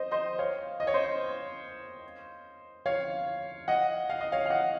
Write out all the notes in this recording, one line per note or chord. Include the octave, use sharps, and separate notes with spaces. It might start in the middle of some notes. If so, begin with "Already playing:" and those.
Already playing: C5 D#5
C5 D#5
C#5 F5
D#5
C#5
C5 D#5
C#5 F5
D#5 F#5
F5
D#5
C#5 F5
F5
D#5 F#5